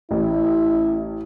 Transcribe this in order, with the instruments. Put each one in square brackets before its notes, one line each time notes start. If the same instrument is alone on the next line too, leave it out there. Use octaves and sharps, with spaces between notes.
[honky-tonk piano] A1 [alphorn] E4